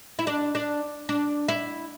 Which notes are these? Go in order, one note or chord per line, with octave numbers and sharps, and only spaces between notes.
E4
D4
D4
D4
E4